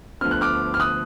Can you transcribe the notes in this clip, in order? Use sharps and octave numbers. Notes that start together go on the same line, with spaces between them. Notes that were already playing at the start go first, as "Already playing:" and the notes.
D2 D3 F3 B3 F6
F#6
D6 F6
F6
D#6 F#6